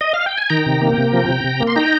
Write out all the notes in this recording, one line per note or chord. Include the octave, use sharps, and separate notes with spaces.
D#5
F5
G5
G#5
D#3 G5 A#5
C3
A#3
C3
F3
C3
C3
A#3
C6
D#4 G5 A#5